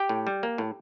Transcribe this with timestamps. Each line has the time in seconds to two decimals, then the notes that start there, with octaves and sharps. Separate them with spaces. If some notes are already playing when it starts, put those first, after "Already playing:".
Already playing: G4 G5
0.09 A2
0.27 G3
0.43 A#3
0.58 A2